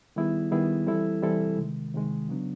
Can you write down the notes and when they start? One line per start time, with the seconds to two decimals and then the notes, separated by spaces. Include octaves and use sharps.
0.16 D#3 G3 B3 E4 G#4
0.51 D#3 G3 B3 E4 G#4
0.87 E3 G3 C4 E4 A4
1.22 E3 G3 C4 E4 A4
1.58 C3 D#3 G#3
1.94 C3 D#3 G#3
2.29 C#3 F#3 B3 D4